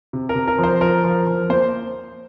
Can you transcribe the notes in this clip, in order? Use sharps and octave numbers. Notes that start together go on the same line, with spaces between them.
C3
A#4
C3
A#4
F3
C5
F3 A#4
F3
F3
A#3 C5